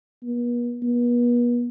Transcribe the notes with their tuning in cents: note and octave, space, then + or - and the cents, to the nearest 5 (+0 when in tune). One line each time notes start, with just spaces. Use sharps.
B3 -45
B3 -40